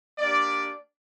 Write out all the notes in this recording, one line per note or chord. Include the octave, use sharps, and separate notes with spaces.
A#3 D4 G4 D5